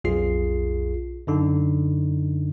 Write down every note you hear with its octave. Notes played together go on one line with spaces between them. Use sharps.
B1 F2 F4 G#4 C7
F#2 D3 D#4